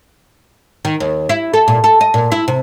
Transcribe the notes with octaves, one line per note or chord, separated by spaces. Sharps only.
D#3
D#2
E4
A4
A#2
A4
D#5
A#2
E4
C3